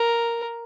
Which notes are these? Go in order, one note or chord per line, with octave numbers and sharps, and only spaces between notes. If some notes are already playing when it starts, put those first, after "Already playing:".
Already playing: A#4